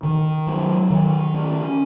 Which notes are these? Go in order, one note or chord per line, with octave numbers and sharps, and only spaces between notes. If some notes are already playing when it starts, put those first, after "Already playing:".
D#3
F#3
D#3
C#4